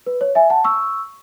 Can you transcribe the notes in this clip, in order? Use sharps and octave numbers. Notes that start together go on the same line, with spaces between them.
B4
C#5
E5 G#5
F#5 A5
C#6 E6